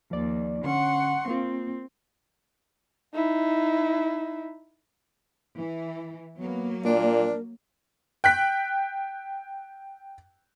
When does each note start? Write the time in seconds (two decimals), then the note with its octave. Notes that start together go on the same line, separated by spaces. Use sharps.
0.11 D#2 F3 D5
0.64 D3 C#4 F#5 C6 C#6
1.28 A#3 C4 F4
3.14 D#4 E4
5.57 E3 E4
6.38 F#3 A#3 B3
6.85 A#2 D4 A#4
8.24 G5 F#6 B6